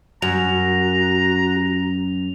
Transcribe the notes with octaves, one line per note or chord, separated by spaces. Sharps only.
F#2 F#4 A#5 F7